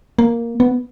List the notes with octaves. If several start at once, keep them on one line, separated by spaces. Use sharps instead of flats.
A#3
B3